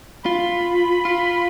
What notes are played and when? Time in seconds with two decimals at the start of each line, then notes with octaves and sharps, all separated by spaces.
0.25 F4 B5
1.05 F4